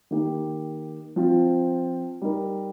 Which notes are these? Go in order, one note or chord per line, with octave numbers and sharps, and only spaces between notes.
D#3 A#3 D#4 G4
F3 C4 F4
G3 D#4 A#4